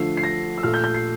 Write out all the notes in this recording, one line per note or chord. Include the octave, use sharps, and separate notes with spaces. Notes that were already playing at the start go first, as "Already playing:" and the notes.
Already playing: D3 F3 A3 C7
C7
A#6
E6
A#2 A3 F6
G6
G6
C7